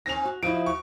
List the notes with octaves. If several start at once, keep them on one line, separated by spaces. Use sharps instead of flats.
G#2 A#3 C4 A#6 F7
F#4
F3 E4 F#4 D#5 D7
F#4 C#6